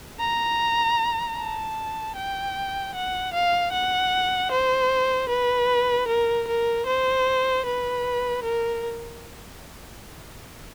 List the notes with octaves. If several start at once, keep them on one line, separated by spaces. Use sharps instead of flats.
A#5
A5
G5
F#5
F5
F#5
C5
B4
A#4
A#4
C5
B4
A#4